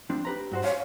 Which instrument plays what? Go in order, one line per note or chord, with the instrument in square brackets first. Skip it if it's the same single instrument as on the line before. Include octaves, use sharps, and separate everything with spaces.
[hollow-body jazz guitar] F3 C4 D4
G4 B4 A#5
G2 F#4 C5
[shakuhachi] C#5 [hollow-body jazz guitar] F5